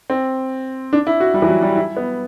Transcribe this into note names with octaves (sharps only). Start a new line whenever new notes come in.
C4
D4
E4
F#4
G3
E3
F#3
G3
E4
B3